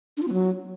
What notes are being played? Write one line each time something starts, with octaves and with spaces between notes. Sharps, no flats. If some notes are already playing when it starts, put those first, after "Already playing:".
D4
F4
B3
F#3